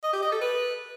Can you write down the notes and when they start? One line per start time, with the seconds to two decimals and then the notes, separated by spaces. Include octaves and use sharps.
0.04 D#5
0.13 G4
0.22 D#5
0.32 A4
0.41 B4